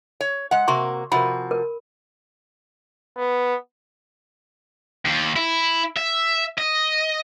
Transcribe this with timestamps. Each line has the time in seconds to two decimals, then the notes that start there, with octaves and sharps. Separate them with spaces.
0.21 C#5
0.51 G#3 F#5
0.68 C3 A#3 F#4 C6 C#6
1.12 C3 F3 F#4 A#4 B5
1.51 A#4
3.17 B3
5.05 D#2
5.36 E4
5.97 E5
6.58 D#5